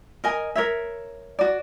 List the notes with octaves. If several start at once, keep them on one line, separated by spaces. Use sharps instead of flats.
A#4 D#5 G#5
A#4 C#5 E5
F#4 D5